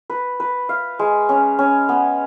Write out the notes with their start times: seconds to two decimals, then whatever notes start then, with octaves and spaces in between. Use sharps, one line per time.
0.10 B4
0.40 B4
0.69 F5
0.99 G#3
1.29 C#4
1.59 C#4
1.89 B3